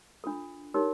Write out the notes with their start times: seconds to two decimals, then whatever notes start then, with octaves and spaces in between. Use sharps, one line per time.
0.24 D4 F4 A4
0.74 D#4 G4 A#4 C#5